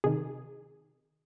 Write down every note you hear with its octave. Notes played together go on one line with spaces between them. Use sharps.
C3 D#3 G#4